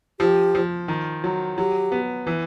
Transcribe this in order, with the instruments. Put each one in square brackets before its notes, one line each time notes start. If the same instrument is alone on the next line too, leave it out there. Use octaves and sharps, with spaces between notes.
[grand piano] F3 [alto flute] G4
[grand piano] F3
D#3
F#3
[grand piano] F#3 [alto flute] G4
[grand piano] B3
E3